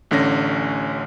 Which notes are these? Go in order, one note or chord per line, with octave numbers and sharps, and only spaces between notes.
A1 D3 C#4 A#6